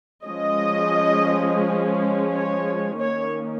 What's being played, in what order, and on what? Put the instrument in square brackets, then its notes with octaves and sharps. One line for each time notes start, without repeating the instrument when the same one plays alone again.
[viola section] F3 G#3 C#4 D#5
C#5
D#3 A#3 C#4 C#5